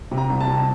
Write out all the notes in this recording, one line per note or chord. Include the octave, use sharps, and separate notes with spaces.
C3
A#5
C2
A5
C3